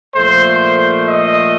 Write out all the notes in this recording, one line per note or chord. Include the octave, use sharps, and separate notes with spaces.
A#2 F3 A3 C5
D#5